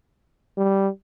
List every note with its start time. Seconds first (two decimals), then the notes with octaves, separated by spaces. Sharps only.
0.57 G3